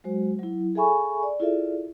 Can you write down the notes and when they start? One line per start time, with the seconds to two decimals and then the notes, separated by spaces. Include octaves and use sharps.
0.04 F#3 G#3 F#4 C5
0.39 F#3 E4
0.75 G#4 A4 E5 G#5 B5 C#6
1.23 D5
1.40 E4 F4 G#4 A4 D5 E5